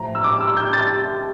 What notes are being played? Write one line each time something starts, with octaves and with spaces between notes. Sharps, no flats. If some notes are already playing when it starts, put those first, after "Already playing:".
Already playing: A2 F3 A#5
E6
D6
E6
G6
A6